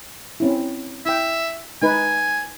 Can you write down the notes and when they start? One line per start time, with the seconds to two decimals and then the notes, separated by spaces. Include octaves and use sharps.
0.40 C4 C#4 E4
1.06 E4 E5 G5
1.82 G#3 D#4 B4 G#5